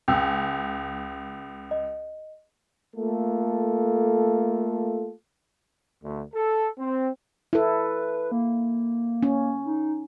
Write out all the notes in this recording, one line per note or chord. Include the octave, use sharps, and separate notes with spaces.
C#2 G5 D#6 E6
D#5
A3 A#3 F4 A4
D2
A4
C4
E4 A4 B4
A#3
C#4
D#4